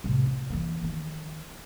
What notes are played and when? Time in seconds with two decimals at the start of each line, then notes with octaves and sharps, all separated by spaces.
0.04 A2 C3
0.26 F4
0.50 E3 A#3
0.83 D#3 F3